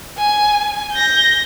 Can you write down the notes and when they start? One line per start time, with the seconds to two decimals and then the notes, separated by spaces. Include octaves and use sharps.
0.18 G#5
0.92 G6 A#6